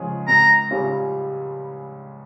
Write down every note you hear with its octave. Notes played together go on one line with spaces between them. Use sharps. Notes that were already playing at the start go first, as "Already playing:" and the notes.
Already playing: C#3 F3 G#3 C#4 G#4
C#2 A#5
C#3 G3 C#4 F4